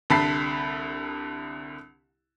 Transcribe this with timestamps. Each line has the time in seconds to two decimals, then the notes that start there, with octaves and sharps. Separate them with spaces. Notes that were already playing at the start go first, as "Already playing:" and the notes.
0.10 C2 D3 A5 B5 B6 C7